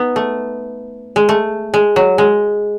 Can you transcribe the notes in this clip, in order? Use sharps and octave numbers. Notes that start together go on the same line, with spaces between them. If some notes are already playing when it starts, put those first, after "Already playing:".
Already playing: B3 D#4
A3
G#3
A3
G#3
F#3
G#3